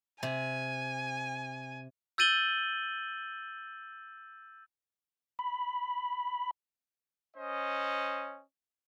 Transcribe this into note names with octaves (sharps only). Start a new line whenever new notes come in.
C3 G#5
E6 G6 A6 D#7 F#7 G7
B5
C#4 C5 D#5